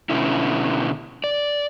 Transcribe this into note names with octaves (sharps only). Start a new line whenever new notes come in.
B2 D3 C#4 E4
D5